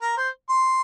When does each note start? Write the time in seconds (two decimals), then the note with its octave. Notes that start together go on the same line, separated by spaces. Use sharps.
0.01 A#4
0.17 C5
0.49 C6